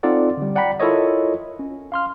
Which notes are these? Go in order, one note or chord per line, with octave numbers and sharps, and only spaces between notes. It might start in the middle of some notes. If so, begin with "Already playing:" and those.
C4 D#4 F4 A4 D5 F#5
D3 G3
D5 F#5 G5 A#5 B5 B6
E4 F4 A4 A#4 C#5 D#5
C#4
F5 C6 F6